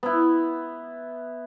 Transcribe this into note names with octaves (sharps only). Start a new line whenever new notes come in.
B3 E4